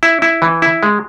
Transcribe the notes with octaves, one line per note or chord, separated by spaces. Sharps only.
E4
E4
E3
E4
G#3